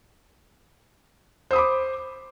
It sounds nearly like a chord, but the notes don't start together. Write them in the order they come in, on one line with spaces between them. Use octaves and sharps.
C5 D#6 B5 D6